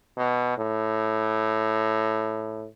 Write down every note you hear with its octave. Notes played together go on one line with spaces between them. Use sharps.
B2
A2